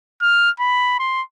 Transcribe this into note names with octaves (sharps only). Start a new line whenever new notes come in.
F6
B5
C6